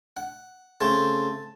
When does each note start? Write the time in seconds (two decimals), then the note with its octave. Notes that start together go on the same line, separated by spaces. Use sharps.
0.17 F#5
0.81 C#3 A3 C4 A5